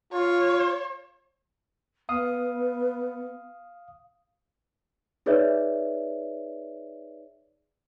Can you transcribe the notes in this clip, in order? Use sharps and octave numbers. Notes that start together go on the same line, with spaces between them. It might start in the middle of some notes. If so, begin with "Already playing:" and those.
F4 C#5
B3 F5 D#6
D#4 G#4 B4 C#5 D5 E5